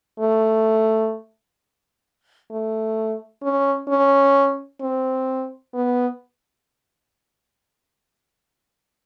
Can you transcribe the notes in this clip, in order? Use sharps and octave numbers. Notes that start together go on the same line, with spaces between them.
A3
A3
C#4
C#4
C4
B3